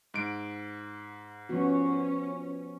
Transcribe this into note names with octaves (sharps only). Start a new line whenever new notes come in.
G#2 D7
F3 B3 C#4 F#4